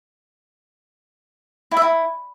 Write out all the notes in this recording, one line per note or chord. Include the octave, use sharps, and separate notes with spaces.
E4
E5
E4